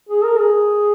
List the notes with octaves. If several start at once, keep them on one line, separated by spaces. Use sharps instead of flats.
G#4
A#4
G#4